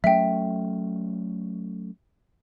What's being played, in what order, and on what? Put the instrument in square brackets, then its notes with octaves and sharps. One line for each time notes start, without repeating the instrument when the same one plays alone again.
[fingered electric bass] F#3 A3 C#4 [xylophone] E5 G5